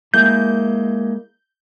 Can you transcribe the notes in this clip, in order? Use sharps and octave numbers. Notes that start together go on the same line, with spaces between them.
G#3 A#3 E4 G6